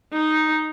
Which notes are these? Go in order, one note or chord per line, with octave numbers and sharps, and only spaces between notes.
D#4